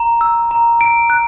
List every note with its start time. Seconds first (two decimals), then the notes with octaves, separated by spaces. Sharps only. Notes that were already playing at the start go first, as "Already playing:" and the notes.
Already playing: A#5
0.21 E6
0.51 A#5
0.81 D7
1.10 F#6